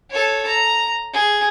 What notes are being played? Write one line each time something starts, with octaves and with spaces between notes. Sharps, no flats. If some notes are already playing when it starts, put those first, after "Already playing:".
A4 C#5
A#5
G#4